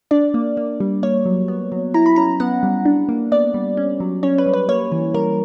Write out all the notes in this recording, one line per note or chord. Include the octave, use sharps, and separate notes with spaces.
D4 D5
A#3
A#3
G3
A#3 C#5
F#3
B3
F#3
E4 A#5
B5
C#4 A#5
B3 F#5
G3
D4
A#3
B3 D5
G3
C#4
F#3
C#4 C#5
B4
G3
B4
A#3 C#5
E3
G3 A#4